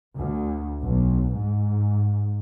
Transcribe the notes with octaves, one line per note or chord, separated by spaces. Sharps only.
D2
B1
G#2